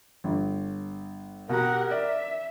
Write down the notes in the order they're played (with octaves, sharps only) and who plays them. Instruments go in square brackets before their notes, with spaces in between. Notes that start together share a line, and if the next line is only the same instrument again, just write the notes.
[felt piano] G1
[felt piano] B2 A#5 [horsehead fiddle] G4 F#5 [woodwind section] A#4
[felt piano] D5 [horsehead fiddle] E5